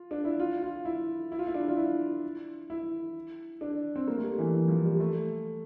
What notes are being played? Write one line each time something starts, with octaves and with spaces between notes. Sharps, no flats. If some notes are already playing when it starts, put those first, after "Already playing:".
Already playing: F4
D4
E4
F4
F4
E4
E4
F4
E4
D4
F4
E4
E4
D4
C4
A#3
A3
G3
E3
E3
F3
G3
A3